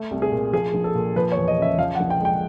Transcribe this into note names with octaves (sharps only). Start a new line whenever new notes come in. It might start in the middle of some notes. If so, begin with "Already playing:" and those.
Already playing: A3
C2
G#4
A#2
F3 G#4
A#1
A4
A#2
F3 B4
C#5
E2
D#5
C#3 E5
F3 F5
F#5
A#1
G5
G#3 G5